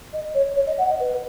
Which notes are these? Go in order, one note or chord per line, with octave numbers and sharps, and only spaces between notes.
D#5
C#5
C#5
D#5
F#5
D#5
B4